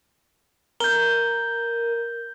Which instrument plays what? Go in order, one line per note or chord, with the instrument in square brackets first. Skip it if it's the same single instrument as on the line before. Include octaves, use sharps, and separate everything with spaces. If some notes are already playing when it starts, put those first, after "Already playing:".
[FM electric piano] A#4 [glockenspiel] G6 G7